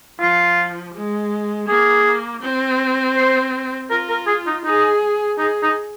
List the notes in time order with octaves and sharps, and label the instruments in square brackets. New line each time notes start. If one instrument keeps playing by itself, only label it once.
[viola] F3 [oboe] F4
[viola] G#3
[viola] A#3 [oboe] G#4
[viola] C4
[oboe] C5
[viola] F4 [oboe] A#4
[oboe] A#4
G#4
D#4
[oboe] D#4 [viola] G#4
[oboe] D#4 [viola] G#4
[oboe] D#4